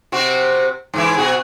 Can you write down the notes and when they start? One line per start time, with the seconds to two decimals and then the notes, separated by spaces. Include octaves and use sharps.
0.12 C3 C4 F#4
0.94 G#2 E3 E4
1.17 B2 F#4 G#4